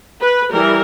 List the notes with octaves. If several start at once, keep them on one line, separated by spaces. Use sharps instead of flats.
B4
E3 G3 A#4